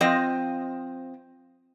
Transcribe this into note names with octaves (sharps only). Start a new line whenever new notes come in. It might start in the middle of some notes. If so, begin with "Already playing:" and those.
F3 C4 D#5